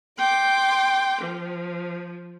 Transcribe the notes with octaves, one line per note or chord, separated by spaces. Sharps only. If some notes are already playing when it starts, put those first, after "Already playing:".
G5 C6 D6
F3